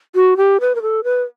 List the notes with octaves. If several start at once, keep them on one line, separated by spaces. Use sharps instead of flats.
F#4
G4
B4
A#4
A4
B4